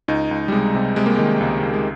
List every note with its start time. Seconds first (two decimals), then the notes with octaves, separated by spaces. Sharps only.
0.08 C#2 D#4
0.31 C#2
0.48 G3
0.52 C3 G#3
0.75 C3
0.96 C3 G#3
1.06 A#3
1.15 D#3 G#3
1.40 C#2
1.63 C#2
1.74 G#3